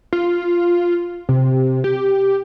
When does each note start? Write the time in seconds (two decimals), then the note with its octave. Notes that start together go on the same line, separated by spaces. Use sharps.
0.13 F4
1.29 C3
1.84 G4